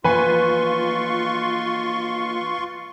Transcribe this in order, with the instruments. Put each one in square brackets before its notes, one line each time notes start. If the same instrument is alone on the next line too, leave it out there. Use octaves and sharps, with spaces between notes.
[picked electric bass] E3 F3 A#3 [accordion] F4 C6 C#6 [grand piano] B4 G#5